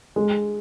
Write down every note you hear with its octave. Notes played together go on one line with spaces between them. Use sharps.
G#3